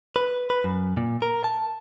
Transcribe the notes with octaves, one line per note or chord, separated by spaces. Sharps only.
B4
B4
F#2
A#2
A#4
A5